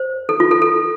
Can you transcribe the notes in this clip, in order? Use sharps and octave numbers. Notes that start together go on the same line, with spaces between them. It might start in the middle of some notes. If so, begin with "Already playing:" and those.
Already playing: C5
A4
F4
A4
A4